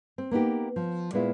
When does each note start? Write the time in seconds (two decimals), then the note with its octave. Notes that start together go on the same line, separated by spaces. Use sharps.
0.18 C4
0.31 A#3 B3 D#4 G4
0.76 F3
1.13 A#2 G#3 B3 E4 F4